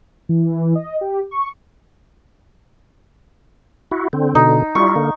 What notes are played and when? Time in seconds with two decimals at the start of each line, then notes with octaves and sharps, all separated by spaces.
0.29 E3
0.75 D#5
1.01 G4
1.31 C#6
3.91 E4 F#4
4.13 D3 C4
4.35 B2 D3 D#4
4.75 G3 E4 F4 C#6
4.96 D3 A#3